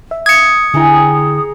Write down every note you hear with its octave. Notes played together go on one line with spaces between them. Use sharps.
E5
D#6 G#6 C#7
D3 E4 G#4 G5 A#5